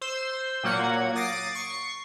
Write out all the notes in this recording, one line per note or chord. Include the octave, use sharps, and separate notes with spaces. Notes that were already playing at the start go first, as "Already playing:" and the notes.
C5 C6 E6
A#2 F#3 A#3 F#5 G#6
D6 D#6 A6 A#6 C7 D7
C#6 C7